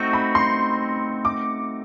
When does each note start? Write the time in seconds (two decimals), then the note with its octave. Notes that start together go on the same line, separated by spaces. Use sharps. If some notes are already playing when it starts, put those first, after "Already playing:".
Already playing: A3 C4 D#4 F#4 C#6
0.13 B5
0.35 C6
1.25 D6